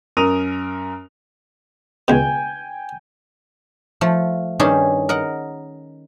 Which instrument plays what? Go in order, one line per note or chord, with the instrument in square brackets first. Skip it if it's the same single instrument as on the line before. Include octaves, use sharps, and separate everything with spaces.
[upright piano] F#2 A#4 D#6 D#7 F7
[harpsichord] C#2 B2 [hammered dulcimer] G5 G#5
[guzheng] F3 A3
G2 D#3 C#4 G4 G#4 A5
A#4 D#5 F#5